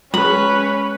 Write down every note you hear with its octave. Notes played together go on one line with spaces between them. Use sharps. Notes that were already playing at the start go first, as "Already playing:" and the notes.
G#3 C#4 G#4 B4 B5